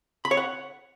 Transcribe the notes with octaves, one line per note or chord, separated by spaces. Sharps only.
B5
C#5
F#5